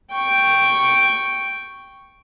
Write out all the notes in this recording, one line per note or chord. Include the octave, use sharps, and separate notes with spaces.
G5 C#6